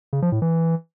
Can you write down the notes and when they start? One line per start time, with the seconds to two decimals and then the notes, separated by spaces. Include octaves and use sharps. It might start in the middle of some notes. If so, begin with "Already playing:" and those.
0.13 C#3
0.22 F3
0.32 A2
0.42 E3